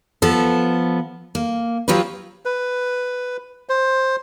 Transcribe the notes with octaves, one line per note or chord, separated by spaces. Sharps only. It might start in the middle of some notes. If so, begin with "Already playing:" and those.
F3 B3 A4
A#3
F3 F#3 F4 G4 A#4 B4
B4
C5